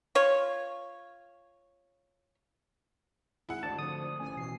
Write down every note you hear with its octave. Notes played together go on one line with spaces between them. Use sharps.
F4 C#5
G#1 E4 G#4 F#5
G#1 D2 D4 A5
D3 F3 D#6
A1 G#5
B2 E3 C7